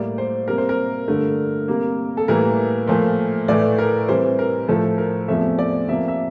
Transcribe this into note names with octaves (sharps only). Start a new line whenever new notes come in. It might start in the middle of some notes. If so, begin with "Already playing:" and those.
Already playing: A2 G3 A#3 D5
C5
C3 G3 A#3 A#4
C5
A#4
G2 D3 A3
C3 G3 A#3
A4
A2 E3 G3 A#3 A#4
A#2 F3 A3
A2 E3 A3 D5
A#4
C3 E3 G3 C5
A#4
A2 F3 A3 A4
A#4
E2 C3 F3 A3 E5
D5
C3 F3 A#3 E5
E5